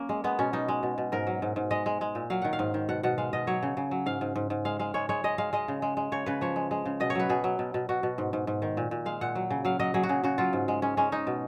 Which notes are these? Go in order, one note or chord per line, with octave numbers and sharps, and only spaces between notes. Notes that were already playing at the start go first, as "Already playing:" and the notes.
Already playing: A#3 C#4
G#3
G#3 B3
B2 C#4
B2 D#4
G#3
B2
B2
G#2 A#4
F#3
G#2
G#2
G#3 D#5
G#3
G#3
A#2
F#3 F5
D#3 F#5
F5
G#2
D#3
B2 F#5
B2 F#5
G#3 F5
B2 D#5
F#3 C#5
C#3
C#3
F#3
G#2 F5
G#2
G#2
G#2
G#3 F5
G#3 F5
G#3 C#5
G#3 C#5
G#3 D#5
G#3 F5
G#3 D#5
C#3
G#3
G#3
C#3 C#5
C#3 B4
F3 C#5
G#3
G#3
C#3
B2 D#5
C#5
F#3 B4
B2 G#4
F#3
B2
B2
B2 F#4
B2
G#2
G#2
G#2
D#3
A#2
A#2
G#3 F5
A#2 F#5
F#3
C#3
F#3 F5
F#3 D#5
F#3 G#4
F#4
C#3 G#4
C#3 F#4
F#3 F4
G#2
G#3
G#3 C#4
G#3 C#4
G#3 D#4
B2